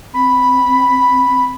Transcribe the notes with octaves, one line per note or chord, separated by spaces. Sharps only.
C4 B5